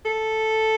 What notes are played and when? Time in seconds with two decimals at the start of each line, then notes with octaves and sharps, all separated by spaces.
0.05 A4